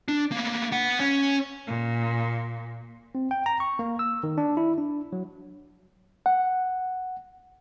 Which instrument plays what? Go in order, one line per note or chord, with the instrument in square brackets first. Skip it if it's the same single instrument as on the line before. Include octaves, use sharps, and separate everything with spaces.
[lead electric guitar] D4
A#3 B3
B3 F#5
C#4 C#5
[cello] A#2
[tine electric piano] C4
G5
A#5
C#6
A#3
E6
D#3
D4
E4
D4
F#3
[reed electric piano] F#5